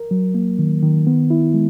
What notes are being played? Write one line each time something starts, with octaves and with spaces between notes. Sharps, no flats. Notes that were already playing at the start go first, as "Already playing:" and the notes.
Already playing: A#4
F#3
A#3
D#3
D#3
B3
E4
G#3